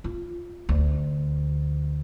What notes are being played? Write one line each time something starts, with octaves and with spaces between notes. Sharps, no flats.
F4
D2